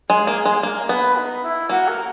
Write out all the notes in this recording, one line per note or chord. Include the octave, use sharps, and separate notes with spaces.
G#3 G#4
A#3
G#3
A#3 A#4
B3 B4
D#4
E4
A#3 F#4
A#4